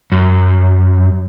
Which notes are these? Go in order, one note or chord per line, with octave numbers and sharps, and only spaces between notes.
F#2